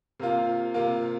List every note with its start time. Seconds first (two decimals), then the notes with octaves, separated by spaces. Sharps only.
0.20 C3 A#3 F4
0.74 C3 A#3 F4